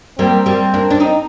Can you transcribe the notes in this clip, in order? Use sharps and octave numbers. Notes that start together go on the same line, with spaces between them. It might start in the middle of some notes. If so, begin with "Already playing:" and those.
G3 A#3 C4
G3 A#3
A#3 D4
D4
C4 D#4